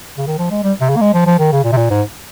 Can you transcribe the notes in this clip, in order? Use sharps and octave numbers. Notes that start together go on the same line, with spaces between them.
C#3
D#3
F3
G#3
G3
C3
C#3
A#3
G#3
F3
F3
D#3
C#3
A#2
C3
A#2
G#2